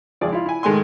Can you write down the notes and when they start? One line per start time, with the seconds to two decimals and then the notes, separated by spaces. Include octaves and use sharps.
0.21 G#1 F3 G#4 D5
0.32 E4 F4
0.46 E4 G#5
0.63 G#2 D#3 G#3 A3 G#5 C6